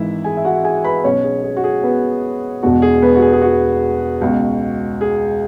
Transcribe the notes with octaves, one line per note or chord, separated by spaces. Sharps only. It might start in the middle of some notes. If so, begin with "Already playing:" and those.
Already playing: G#1 G#2 E3 E4 E5
G#4 G#5
E5
F#4 F#5
G#4 G#5
B4 B5
B1 B2 C#4 C#5
G#4
G#4
F#4
G#4
B3 B4
E1 E2 B2 F#4
G#4
B3 B4
F#4
G#4
G#4
F#4
C#2 B2
G#4